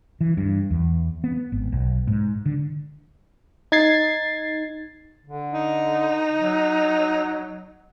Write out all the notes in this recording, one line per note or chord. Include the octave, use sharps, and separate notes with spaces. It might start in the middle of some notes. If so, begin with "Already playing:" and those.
E3
G2
E2
B3
G#1
B1
G#2
D3
D#4 G#6 A6 C7
D3
D#4
F#3